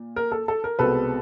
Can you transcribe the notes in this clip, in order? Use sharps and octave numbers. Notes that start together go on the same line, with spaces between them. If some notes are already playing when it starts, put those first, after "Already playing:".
Already playing: A#2
A#4
A4
A4
A#4
C2 B2 G#3 C4 A4 B4